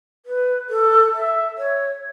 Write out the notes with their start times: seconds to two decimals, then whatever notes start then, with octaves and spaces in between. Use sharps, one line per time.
0.26 B4
0.70 A4
1.14 E5
1.58 C#5